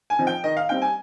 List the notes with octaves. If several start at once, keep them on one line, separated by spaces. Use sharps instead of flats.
G#5
F3 C4 D#4
G5
D#3 D#5
F5
G3 C4 D#4 G5
G#5